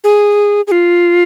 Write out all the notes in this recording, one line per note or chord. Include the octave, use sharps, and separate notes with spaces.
G#4
G#4
F4